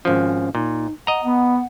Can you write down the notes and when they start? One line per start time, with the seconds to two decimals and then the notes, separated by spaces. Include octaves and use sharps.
0.05 G#1 F3 C#4
0.55 A#2 D#4
1.07 D#5 F#5 A#5
1.24 B3 F#5